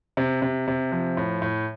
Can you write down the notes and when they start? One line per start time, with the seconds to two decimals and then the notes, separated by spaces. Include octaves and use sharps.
0.17 C3
0.42 C3
0.68 C3
0.92 F3
1.17 A2
1.42 A2